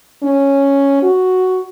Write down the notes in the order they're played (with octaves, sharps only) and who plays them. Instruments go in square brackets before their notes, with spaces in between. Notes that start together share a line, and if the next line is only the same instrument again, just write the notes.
[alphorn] C#4
F#4